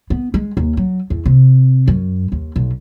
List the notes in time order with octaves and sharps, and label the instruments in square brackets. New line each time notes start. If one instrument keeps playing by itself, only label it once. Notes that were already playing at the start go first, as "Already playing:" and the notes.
[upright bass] B3
G#3
D#2
F#3
E2
C3
F#2
D#2
B1